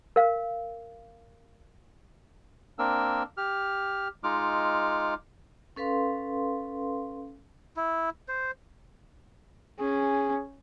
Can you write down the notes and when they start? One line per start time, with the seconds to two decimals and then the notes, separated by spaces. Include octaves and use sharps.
0.16 A#4 F5
2.79 A#3 C4 D4 A#4 E6
3.37 G4 F6
4.24 G#3 D#4 F4 D6 F6
5.76 C#4 A4 B4 F5 C6
7.77 E4
8.28 C5
9.79 C#4 G#4